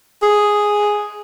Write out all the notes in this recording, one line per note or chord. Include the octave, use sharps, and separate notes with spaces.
G#4